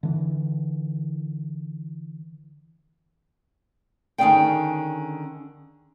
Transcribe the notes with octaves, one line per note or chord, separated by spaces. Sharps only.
D3 E3
D3 D#3 C#4 G#4 D5 G5